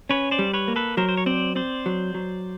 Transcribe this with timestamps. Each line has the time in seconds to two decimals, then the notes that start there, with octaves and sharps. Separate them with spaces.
0.10 C#4 B4 C#5
0.31 C5 D5
0.39 G3
0.53 B4 C#5
0.68 A#3
0.76 A4 B4
0.97 F#3 A#4 C5
1.09 C5
1.17 C#5
1.26 C4 C5 D5
1.55 C4 C5 D5
1.86 F#3
2.14 F#3